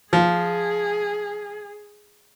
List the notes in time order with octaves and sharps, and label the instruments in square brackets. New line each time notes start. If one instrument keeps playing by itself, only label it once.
[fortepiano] F3 [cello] G#4